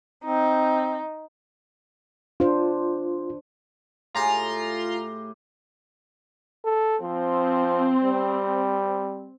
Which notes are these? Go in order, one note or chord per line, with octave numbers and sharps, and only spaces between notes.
C4 D#4
D4 F4 C5
A2 F4 G4 G#4 A#5 C6
A4
F3 C4
G3